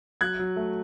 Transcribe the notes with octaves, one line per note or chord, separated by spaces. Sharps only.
F#3 F#6 G#6
F#3
A3